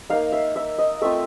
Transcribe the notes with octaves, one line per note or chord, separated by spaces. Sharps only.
A#3 D#4 F5
E5
E5
D#5
A3 C4 F4 E5